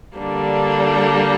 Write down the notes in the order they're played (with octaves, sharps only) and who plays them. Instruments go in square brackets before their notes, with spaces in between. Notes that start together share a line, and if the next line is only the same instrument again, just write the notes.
[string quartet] D3 G3 A#3 D4